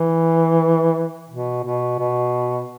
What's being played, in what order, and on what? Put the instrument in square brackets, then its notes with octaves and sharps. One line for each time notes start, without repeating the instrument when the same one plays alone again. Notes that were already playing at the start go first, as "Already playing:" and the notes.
Already playing: [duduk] E3
B2
B2
B2